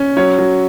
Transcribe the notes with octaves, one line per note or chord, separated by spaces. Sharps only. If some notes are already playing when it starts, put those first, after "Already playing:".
Already playing: C#4
F#3 C#5
F#3